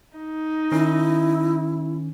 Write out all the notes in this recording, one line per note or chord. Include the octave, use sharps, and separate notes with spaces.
D#4
D#3 C#4 E4